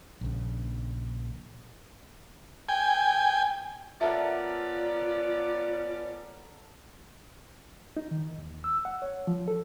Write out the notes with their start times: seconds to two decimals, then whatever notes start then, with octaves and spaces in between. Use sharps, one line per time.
0.21 A#1 C#3
2.69 G5 G#5
4.01 B3 C#4 F4 A4 A#4 D5 E5 F#5
7.97 D#4
8.11 D#3
8.38 D#2
8.64 E6
8.85 F#5
9.02 C#5
9.27 F3
9.48 A4